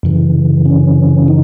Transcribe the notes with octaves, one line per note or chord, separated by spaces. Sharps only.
F#2 C#3 E3
C#4
D#4